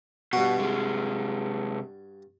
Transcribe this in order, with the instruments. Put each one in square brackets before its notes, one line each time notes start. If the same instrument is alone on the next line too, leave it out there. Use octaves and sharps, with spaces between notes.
[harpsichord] G2 F#4 [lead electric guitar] B2
[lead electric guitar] C3 G#3